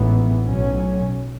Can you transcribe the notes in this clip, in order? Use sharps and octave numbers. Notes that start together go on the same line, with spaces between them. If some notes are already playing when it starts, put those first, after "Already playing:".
Already playing: A1 G#2 E3 B3
B1 A2 F#3 C#4